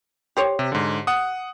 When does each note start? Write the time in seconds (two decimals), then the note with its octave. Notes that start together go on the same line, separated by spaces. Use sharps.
0.37 G4 C5 C#5
0.59 C3
0.72 G#2 D3
1.07 F#5 D#6